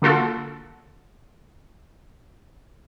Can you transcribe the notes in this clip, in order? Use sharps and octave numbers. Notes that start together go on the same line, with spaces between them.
D3 A#3 F4 F#4 A4